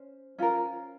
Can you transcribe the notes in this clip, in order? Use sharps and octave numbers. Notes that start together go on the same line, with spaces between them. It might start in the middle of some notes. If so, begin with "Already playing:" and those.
Already playing: C#4 C5
C#4 F4 A#4